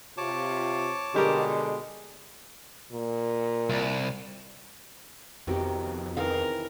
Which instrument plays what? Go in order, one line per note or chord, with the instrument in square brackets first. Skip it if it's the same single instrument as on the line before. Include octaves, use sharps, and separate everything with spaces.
[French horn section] C3 F4 [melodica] C#5 A5 D6
[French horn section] B2 D3 [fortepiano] G3 G4 A#4 [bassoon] G#3
[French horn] A#2
[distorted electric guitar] C2
[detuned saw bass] F2 [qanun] C3 D#3 A#4 [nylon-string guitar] B3 F#4 G4
[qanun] D#3 E3 D#4 [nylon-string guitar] C4 G#4 F5 [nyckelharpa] A#4